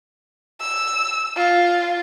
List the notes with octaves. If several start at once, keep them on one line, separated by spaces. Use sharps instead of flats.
E6
F4